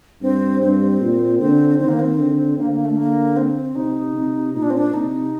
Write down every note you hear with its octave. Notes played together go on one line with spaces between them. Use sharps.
G2 C4
G2 C4
A#2
D3 C4
D#3 C4
A#3
C4
D3
D3 A#3
A#3
A3
A#3
C4
C3 D#4
C3
A#2 D#4
D4
C4
D4
C3 D#4